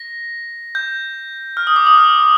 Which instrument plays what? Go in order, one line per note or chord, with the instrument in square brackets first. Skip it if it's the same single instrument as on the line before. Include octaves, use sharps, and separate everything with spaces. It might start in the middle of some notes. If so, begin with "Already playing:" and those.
Already playing: [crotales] A#6
G6
F6
D#6
D6
D#6
F6